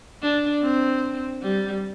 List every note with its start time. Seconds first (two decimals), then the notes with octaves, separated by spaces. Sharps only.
0.22 D4
0.62 C4
1.42 G3